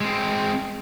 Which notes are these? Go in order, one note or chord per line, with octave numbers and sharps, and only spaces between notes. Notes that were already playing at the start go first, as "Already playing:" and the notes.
G#3 C4